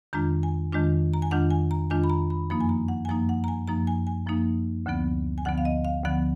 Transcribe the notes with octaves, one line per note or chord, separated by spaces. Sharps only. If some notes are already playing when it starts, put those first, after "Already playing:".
F2 D#3 G#3 D4 F4 A#5
G#5
F2 D#3 G#3 D4 F4
A#5
G#5
F2 D#3 G#3 D4 F4 F#5
G#5
A#5
F2 D#3 G#3 D4 F4 G#5
B5
A#5
B5
F#2 F3 A#3 D#4 B5
G#5
A#5
F#5
G#5
F#2 F3 A#3 D#4 A#5
F#5
A#5
G#5
F#2 F3 A#3 D#4 A#5
G#5
G#5
F#2 F3 A#3 D#4
D2 D3 F3 B3
G#5
D2 D3 F3 B3 F#5
F5
D#5
F5
D2 D3 F3 B3 F#5